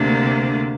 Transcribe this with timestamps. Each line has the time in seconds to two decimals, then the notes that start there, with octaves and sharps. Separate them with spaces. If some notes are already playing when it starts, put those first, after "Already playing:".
Already playing: D2 C3 A#3 D4